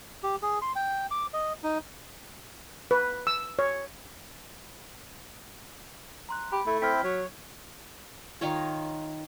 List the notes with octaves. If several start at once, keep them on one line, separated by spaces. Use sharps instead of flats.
G4
G#4
C6
G5
D6
D#5
D#4
B4
E6
C#5
A#5 C6 F#6
G4 B5
A3 E4
C4 E4 G5 F6 B6
F#3 C#5
D#3 D#4 F4 C#5